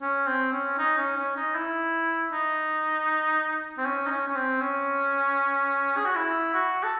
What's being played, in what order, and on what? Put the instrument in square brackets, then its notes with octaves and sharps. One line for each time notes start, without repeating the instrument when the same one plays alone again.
[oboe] C#4
C4
C#4
D#4
C#4
C#4
D#4
E4
D#4
C4
C#4
D#4
C#4
C#4
C4
C#4
G#4
F#4
E4
F#4
A4